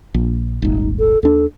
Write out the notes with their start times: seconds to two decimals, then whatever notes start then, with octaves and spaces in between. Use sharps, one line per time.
0.14 A#1
0.62 D#1 G#1 D#4
0.99 A4
1.23 D#2 D4 A4